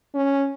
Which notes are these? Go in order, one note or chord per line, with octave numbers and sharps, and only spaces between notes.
C#4